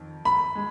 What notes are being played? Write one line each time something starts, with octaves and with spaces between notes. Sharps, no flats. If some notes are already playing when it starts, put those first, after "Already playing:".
Already playing: F2 D#3
B5
G#3